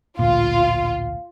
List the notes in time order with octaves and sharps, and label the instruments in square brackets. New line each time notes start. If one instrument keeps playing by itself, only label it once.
[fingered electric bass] A1 D2 A#2 [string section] F4